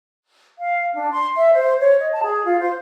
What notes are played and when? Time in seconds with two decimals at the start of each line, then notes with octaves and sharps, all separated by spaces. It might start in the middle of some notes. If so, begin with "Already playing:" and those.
0.58 F5
0.94 D4
1.11 C6
1.35 E5
1.54 C5
1.80 C#5
1.99 D#5
2.12 A5
2.23 G#4
2.45 F4
2.59 C5